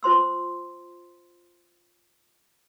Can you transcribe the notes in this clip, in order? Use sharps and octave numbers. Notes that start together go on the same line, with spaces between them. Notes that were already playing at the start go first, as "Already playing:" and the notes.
F4 C5 C6 E6